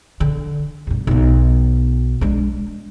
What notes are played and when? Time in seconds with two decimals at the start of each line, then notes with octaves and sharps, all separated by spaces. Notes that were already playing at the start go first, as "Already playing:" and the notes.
0.20 D3
0.87 G2 B2
1.07 B1 B3
2.21 G#3 D4